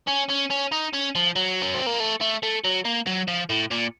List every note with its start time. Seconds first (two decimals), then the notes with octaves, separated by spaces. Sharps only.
0.08 C#4
0.29 C#4
0.51 C#4
0.72 D#4
0.93 C#4
1.15 F3
1.36 F#3
1.62 C#4
1.74 C4
1.86 A#3
2.00 A3
2.21 A3
2.43 A3
2.65 F#3
2.85 A#3
3.07 F#3
3.28 F3
3.49 A2
3.71 A#2